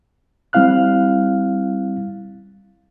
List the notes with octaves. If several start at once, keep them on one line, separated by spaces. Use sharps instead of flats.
G3 C4 E4 F5 F6 F#6